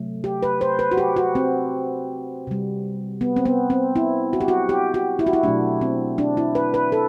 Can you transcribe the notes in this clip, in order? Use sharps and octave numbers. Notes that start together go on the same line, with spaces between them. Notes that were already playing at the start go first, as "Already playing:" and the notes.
Already playing: C3 F#3 A3
G4
B4
C5
B4
F#4
G4
F#4
C4
C3 G3
B3
C4
B3
C4
E4
F#4
G4
F#4
G4
F#4
E4
F#4
E4
B2 F#3 A3 D4
C4
D4
E4
B4
B4
A4